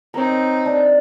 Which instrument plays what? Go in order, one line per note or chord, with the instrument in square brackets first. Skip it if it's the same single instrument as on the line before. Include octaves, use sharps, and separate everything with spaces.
[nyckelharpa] C4 D#4 [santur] A#4 C#5
[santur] D4